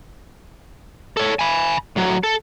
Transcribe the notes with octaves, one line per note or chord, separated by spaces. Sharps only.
A4 C#5
G#5 B5
A2 F#3
A4